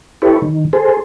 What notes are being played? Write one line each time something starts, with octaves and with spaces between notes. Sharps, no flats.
E4 G4 A4 B4 C#5
D#3
G#4 A4 C5